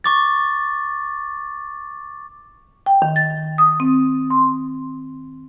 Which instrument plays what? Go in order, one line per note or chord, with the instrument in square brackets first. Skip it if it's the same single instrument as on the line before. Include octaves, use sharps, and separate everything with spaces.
[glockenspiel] C#6 D6 A6
[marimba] G5
D#3
A6
D#6
C4
C6